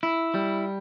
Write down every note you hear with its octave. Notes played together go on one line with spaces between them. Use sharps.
E4
G3